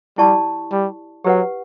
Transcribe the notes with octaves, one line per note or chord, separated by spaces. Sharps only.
G3 E4 G4 D5 A5 C#6
G3
F#3 G4 B4 F#5